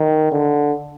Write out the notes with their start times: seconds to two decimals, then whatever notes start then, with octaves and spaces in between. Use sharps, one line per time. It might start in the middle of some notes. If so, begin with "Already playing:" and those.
Already playing: D#3
0.31 D3